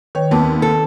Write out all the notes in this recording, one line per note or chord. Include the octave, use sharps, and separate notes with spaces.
D#3 B4 C#5 G5
D#2 B3 C4 A5 D6
A4